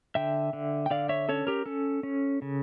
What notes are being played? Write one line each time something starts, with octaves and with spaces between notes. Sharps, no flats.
D3 E5 G5
D3
G5
D3 D5 F5
C#5 E5
C#4 A4 C#5
G4 A#4
C#4 A4
C#4
C#3